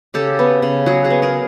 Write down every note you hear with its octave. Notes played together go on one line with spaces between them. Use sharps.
C#3 G4 A4
B3
C#3
F#3 F#4 G#4
F#4 G#4
B3
G#4 A#4